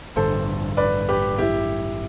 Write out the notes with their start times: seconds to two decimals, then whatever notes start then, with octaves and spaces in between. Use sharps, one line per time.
0.16 A1 G2 D3 A4 C5
0.77 B4 D5
1.09 G4 B4
1.38 E4 G4